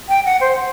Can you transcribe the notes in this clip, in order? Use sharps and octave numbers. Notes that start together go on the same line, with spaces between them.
G5
F#5
C5